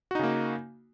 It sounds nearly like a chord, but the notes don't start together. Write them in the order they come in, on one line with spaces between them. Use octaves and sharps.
F#4 D#4 C#3 A#3